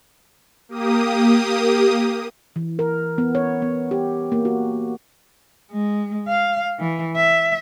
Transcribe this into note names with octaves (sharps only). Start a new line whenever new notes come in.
A#3 G4 D#6
E3
A#4
B3
C#5
B3
G4
A#3
F#4
G#3
F5
E3
E5